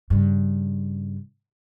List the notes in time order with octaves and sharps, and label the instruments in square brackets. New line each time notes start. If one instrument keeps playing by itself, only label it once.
[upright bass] G2 C#3